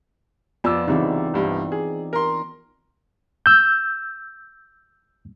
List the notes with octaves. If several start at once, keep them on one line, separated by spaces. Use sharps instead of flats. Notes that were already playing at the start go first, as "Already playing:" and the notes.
F2 B3 F4 D5 E6
C2 C#3 E3 C4 D#4
C2 G2
G#4
A#4 C6
E6 G6